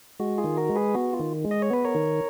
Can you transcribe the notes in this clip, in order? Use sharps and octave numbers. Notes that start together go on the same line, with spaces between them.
G#3 F#4
F4 G#4
D#3
F#4 A#4
G#3
G#4 B4
B3 F#4
F4
D#3
G#3
D#5
C#5
B3 B4
A#4 C#5
D#3